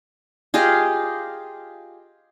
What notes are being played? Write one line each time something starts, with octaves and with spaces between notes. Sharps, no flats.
F4 G4 G#4 D#5